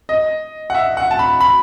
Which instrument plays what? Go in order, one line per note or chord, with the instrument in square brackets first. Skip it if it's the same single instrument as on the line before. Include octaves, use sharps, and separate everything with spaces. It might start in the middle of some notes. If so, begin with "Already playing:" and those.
[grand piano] D#5
F#5
E5
F#5
A5
B5
B5